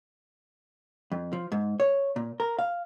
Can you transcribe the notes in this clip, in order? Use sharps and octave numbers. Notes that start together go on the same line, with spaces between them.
F2
F3
G#2
C#5
A#2
A#4
F5